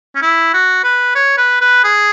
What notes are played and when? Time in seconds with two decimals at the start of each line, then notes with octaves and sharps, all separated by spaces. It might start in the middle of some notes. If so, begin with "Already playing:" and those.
0.15 C#4
0.22 E4
0.54 F#4
0.84 B4
1.15 C#5
1.38 B4
1.61 B4
1.84 G#4